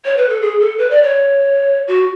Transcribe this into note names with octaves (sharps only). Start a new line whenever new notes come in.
C#5
B4
A4
G#4
A4
B4
D5
C#5
F#4